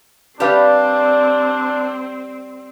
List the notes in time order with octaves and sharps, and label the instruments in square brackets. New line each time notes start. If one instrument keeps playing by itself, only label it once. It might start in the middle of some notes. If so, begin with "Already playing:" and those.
[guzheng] G3 [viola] C4 [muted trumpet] D4 [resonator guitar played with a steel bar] G4 B4 F5